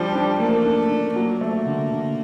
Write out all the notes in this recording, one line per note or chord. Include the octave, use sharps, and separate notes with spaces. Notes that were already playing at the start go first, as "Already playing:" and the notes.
Already playing: F3 G3 D4
D4
A3 A#3
D4
D4
F#3 A#3
A3
D3
D3